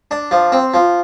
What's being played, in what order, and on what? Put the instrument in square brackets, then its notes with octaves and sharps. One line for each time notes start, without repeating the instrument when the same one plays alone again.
[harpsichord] D4
F3
C4
F3